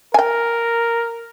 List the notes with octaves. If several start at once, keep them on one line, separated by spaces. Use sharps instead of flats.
A#4 G5 G#5